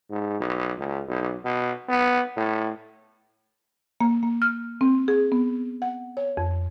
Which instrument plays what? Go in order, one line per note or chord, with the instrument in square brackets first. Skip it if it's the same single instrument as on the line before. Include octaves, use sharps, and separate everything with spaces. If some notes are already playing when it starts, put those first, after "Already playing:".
[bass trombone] G#2
B1
C#2
B1
B2
B3
A2
[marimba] A#3
A#3
F6
C4
G#4
B3
F#5
C#5
F2